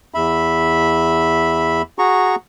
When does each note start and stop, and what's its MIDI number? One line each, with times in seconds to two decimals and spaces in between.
0.14 1.82 40
0.14 1.82 76
0.14 1.82 83
1.99 2.35 66
1.99 2.35 68
1.99 2.35 82
1.99 2.35 85